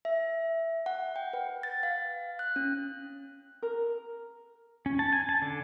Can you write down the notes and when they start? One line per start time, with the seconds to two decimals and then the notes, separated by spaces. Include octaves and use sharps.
0.05 E5
0.86 F#5
1.16 G5
1.33 B4
1.63 A6
1.83 F5
2.39 F#6
2.56 C#4
3.62 A#4
4.86 C#4
4.99 A5
5.13 G#5
5.29 A5
5.42 D3